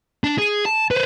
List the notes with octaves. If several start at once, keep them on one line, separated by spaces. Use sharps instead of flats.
D4
G#4
A5
B4 C5